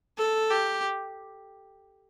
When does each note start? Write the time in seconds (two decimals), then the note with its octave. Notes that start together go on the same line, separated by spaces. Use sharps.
0.18 A4
0.50 G4